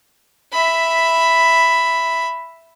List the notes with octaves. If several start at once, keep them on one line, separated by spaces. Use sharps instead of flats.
E5 B5